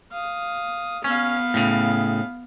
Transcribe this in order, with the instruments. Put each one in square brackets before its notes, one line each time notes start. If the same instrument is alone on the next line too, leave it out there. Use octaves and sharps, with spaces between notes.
[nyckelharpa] F5 D#6
[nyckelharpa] B3 F5 [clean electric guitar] C#4
[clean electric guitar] A2 C#3